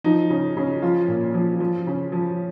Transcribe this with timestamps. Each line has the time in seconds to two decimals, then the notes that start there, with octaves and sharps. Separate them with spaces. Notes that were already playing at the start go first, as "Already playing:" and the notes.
0.04 F3 D#4
0.30 C#3
0.57 C#3
0.82 F3 F4
1.08 A#2
1.34 F3
1.60 F3
1.87 C#3
2.12 F3